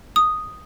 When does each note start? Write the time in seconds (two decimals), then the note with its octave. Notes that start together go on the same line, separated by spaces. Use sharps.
0.16 D#6